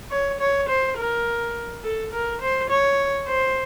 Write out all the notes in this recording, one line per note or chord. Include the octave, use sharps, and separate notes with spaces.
C#5
C#5
C5
A#4
A4
A#4
C5
C#5
C5